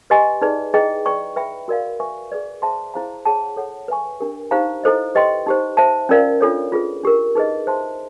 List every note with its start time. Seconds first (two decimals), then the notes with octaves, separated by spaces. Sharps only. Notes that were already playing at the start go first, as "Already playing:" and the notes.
0.10 G4 B4 D#5 G#5 C6
0.42 D#4 G#4 B4 D5
0.74 E4 G#4 B4 D#5 G5
1.05 B4 D5 G5 A#5 C#6
1.36 B4 E5 G5 B5
1.68 F#4 A#4 D5 F5
2.00 B4 E5 G#5 C#6
2.32 G#4 B4 D5
2.62 G#4 C5 E5 A5 C6
2.94 E4 G#4 C5 F5 A#5
3.25 G#4 C#5 F#5 A5
3.57 A4 C#5 F#5
3.88 B4 E5 G#5 C#6
4.20 D4 G4 A#4
4.51 D#4 G4 C5 F5 A#5
4.84 E4 A4 C5 D#5
5.15 G4 B4 D#5 G5 C6
5.46 D#4 G4 C5
5.77 C5 E5 A5
6.09 C#4 F4 A#4 D5 F5
6.41 D4 F4 A4 C#5
6.72 F4 G#4 B4
7.03 D4 G4 A#4
7.35 D#4 G#4 B4 D#5
7.67 C5 E5 A5 C6